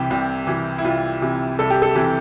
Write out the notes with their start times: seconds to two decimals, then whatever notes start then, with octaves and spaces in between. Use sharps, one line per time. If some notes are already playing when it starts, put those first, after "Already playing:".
Already playing: C2 C3 E3 G4
0.11 C2
0.47 C3 E3
0.78 E4
0.84 C2 F4
1.22 C3 E3
1.59 C2 A4
1.70 G4
1.82 A4
1.96 C3 E3